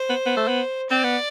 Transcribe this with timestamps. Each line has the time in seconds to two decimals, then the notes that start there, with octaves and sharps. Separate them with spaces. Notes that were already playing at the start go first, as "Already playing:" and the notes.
Already playing: C5
0.09 B3
0.26 B3
0.37 A3
0.48 B3
0.90 C4 D5
1.04 B3